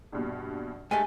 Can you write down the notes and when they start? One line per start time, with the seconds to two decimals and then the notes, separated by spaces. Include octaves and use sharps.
0.12 A#1 G2 B2
0.91 G2 G#3 A3 G#5